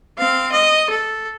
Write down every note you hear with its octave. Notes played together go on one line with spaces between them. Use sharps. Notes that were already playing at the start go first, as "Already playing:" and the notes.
C4 F5
D#5
A4